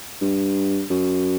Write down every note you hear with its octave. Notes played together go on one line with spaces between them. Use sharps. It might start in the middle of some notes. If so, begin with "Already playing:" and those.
G2
F#2